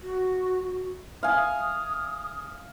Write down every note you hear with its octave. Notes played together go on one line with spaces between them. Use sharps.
F#4
F5 G#5 D#6